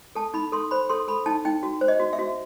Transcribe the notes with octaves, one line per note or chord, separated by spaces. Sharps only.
A4 A5
D#4 B5
A4 C6
C5 B5
A4 C6
A4 B5
D#4 A5
D#4 G5
F#4
C5
D#5
F#4
E5
F#4